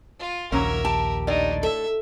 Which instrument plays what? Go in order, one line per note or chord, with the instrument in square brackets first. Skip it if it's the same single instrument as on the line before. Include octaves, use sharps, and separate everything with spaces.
[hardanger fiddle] F4
[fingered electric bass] A#1 D#2 [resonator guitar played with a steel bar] F#3 A#3 C#4 [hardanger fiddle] A#4 E5
[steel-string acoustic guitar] G4 [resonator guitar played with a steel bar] A5
[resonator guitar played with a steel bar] A2 D5 [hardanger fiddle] D4 D#4
[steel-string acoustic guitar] A4 [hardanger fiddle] E5